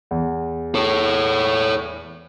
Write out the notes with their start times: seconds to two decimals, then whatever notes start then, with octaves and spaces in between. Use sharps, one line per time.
0.11 E2
0.75 A4 C#5